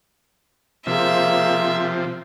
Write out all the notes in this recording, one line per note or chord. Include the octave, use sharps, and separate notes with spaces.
C3 F3 A#3 G#4 E5